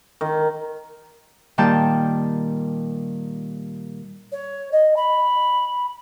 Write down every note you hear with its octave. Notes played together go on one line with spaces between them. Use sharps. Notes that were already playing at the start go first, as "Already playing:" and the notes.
D#3
A#2 D#3 G3 G5 A5 G6
C#5
D#5
B5